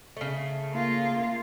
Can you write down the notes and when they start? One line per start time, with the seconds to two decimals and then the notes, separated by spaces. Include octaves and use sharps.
0.17 C#3 A3
0.72 A#3 F4